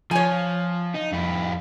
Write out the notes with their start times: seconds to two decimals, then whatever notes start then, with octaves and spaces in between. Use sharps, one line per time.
0.11 F3 C#5 G#5
0.95 D#4
1.13 F2 E4